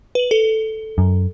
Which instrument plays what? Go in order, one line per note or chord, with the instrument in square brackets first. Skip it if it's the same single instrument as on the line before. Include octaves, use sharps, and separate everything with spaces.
[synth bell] B4 F#7
A4
[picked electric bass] F#2